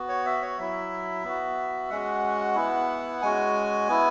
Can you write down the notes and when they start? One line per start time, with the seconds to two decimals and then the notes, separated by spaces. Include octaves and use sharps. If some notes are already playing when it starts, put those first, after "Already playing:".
Already playing: B3 F#4
0.09 C#5
0.26 E5
0.42 C#5
0.58 F#3 E4 E5
1.24 B3 F#4
1.90 G#3 C#4 F#4 F#5
2.55 B3 E4
3.22 G#3 C#4 F#4 G#5
3.88 B3 E4